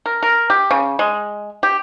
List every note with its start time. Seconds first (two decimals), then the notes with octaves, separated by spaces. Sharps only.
0.06 A#4
0.23 A#4
0.50 G4
0.71 C#3
0.99 G#3
1.63 G4